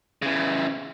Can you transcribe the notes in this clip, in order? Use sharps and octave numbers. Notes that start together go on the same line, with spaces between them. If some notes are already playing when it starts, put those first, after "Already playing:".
C#3 E3